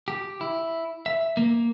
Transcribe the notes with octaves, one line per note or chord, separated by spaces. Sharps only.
G4
E4
E5
A#3